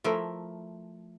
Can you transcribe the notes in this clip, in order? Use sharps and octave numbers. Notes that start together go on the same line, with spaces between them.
F3 A3 E4 A#4